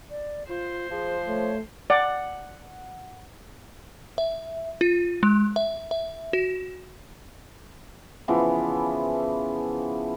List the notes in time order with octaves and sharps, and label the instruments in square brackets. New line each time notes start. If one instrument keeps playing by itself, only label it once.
[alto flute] D5
[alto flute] F4 [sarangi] C5
[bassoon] F3 [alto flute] G#4
[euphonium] A3 [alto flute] C#5
[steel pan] D5 [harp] F#5
[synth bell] E5
F4
G#3
E5
E5
F#4
[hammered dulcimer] C#3 E3 F3 B3